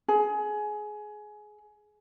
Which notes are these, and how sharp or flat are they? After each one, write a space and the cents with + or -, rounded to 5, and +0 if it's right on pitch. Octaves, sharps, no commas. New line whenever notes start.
G#4 +20